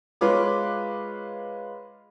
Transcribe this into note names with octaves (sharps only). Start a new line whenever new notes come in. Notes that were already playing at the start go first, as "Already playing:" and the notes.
G#3 F4 B4 C#5 D6